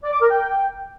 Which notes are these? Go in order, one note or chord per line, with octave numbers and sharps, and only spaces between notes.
D5
D6
A#4
G5